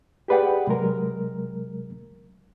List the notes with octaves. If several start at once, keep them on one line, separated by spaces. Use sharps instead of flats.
G4 G#4 B4 D5 F#5 G5
C3 F#3 G#3 A#4